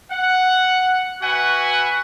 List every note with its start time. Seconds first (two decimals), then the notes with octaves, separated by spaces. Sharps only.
0.12 F#5
1.22 F#4 B4 E5 F#5 G#5